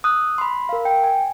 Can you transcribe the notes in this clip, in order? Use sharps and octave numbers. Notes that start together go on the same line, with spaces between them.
D#6 E6 F#6
B5 C6
A#4 F5
G5
G#5